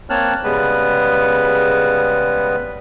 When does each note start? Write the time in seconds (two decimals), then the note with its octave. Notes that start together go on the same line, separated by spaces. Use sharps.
0.10 A#3 C4 C#5 A5 F6 F#6
0.44 C#3 G3 G#3 B3 B4